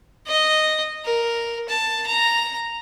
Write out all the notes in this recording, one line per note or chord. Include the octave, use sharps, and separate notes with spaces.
D#5
A#4
A5
A#5